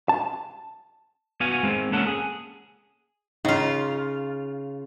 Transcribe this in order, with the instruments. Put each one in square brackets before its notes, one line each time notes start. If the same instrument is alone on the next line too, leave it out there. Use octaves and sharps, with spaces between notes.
[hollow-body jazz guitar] A5
[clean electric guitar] B3 F#4 F5 G#5
G#3 C4
A#3 C#4 A4 F#5
G#4
[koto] C#3 F4 [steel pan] D#4